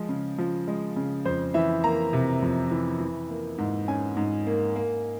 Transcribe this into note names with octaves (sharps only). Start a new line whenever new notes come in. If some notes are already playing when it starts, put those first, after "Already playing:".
Already playing: F3 G#3
C#3
F3
G#3
C#3
F2 C5
E3 E5
A#3 A#5
C3
F2
E3
E3
A#3
G#2
C#4 G#5
G#2
A#3
A#3